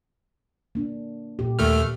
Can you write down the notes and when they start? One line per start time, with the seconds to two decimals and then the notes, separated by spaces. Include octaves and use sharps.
0.75 A#3 D4
1.39 A#2 G4
1.59 D#2 A3 F6